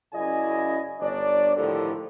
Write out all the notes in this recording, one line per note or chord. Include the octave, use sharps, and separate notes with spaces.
F#2 C#3 E4 D5 D#5 G#5
G1 D4 C#5 D5
A2 D3 D#3 F3 G4 A4